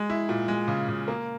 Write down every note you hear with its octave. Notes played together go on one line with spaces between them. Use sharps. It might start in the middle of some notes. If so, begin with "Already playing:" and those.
Already playing: G#3
E4
A#2
G#3
C#3
C#3
A#3